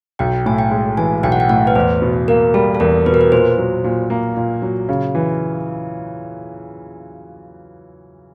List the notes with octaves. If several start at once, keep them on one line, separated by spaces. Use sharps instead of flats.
B1 G5
A2 G#5
G5
G#3
E3 G#5
B1 G5
F#5
G5
A2 F#5
B4
E2 C5
B2
A#3 A#4
G3 A4
A4
E2 A#4
B2 B4
A#4
B4
A#2 C5
F#3
A#2
A#3
A#2
F#3
C#3
E3